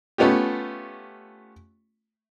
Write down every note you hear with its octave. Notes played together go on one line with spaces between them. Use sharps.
A3 B3 C#4 F4 G4